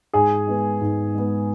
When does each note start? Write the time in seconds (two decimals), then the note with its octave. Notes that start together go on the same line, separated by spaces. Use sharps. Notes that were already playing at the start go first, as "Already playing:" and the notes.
0.13 G#2 G#4 G#5
0.47 G#3 B3
0.81 G#2
1.14 G#3 B3